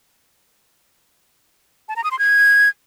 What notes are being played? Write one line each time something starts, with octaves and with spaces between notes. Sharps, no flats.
A5
A#5
D#6
C6
G#6